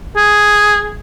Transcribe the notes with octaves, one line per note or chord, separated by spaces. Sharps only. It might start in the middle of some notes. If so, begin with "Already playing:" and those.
G#4